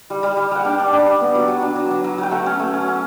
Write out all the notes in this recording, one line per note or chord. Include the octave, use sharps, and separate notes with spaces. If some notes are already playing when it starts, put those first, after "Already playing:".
G3
G3
G3
G3 F#5
D4 G5
D4
D4
D4
B3
F#3
F#3
D4
F#3
F#3
F#3
F#3
G5
A3 F#5
C#4
A3
C#4
C#4